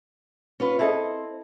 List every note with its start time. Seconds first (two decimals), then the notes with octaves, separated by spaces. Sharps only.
0.60 C#4 F4 B4
0.79 C4 E4 A4 D#5